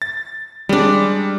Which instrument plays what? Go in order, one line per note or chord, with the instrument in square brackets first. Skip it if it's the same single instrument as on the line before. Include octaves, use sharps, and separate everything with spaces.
[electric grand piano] A6
[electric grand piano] G3 [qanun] G#3 D4